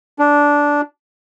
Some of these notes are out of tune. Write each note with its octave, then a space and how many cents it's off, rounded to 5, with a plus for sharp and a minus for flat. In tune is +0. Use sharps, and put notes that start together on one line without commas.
D4 -10